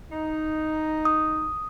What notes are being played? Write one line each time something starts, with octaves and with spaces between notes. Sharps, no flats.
D#4
D#6